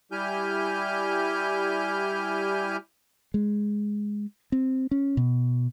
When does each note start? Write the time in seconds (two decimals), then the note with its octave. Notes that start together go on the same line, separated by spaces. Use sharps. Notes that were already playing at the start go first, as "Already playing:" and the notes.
0.12 G3 E4 G4 G#5 F6 G6
3.34 G#3
4.52 C4
4.91 C#4
5.17 B2